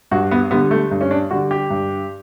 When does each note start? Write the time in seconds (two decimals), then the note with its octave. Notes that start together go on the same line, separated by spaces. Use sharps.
0.11 G2 F#4
0.31 B3
0.51 D3 G3 B3
0.71 A3
0.91 G2
1.01 C#4
1.11 D4
1.31 D3 G3 F#4
1.51 G4
1.70 G2